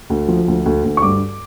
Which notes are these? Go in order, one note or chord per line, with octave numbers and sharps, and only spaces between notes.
D2
F3
D2
D2
D2
C#6
G2 D6